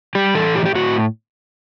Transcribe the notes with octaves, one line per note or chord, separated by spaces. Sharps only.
G3 G4
E3 A4
A2 G4
G4
A2 F#4